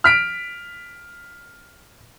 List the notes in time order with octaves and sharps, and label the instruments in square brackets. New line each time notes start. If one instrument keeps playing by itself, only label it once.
[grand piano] F6 B6 D7